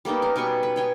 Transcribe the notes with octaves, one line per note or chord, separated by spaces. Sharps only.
G3 A#3 B3 D#4
C#4 A#4
B2 G3 G#5 C#6
B4
C#5 G5 G#5